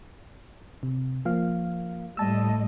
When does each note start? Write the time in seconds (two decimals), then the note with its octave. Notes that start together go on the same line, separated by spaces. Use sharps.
0.83 C3
1.25 F3 A#3 F5
2.17 A2 G3 D#5 A5 E6